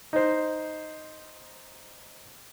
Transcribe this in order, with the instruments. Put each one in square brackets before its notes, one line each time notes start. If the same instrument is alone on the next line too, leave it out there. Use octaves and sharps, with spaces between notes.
[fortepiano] D#4 C5